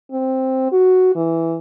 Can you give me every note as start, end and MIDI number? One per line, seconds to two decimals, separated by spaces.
0.11 0.70 60
0.72 1.13 66
1.16 1.57 52